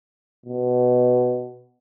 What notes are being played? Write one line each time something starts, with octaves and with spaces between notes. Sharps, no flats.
B2